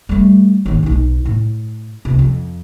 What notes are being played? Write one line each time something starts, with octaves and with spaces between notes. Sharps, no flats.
G3 A3
G#1 D#2
B1 D#4
A2
C#2 C3
F2